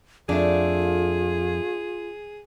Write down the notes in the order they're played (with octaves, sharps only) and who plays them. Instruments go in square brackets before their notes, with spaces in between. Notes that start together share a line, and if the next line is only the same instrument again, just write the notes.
[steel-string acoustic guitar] F2 [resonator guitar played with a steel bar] A3 D4 [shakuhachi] F4 [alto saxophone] G#4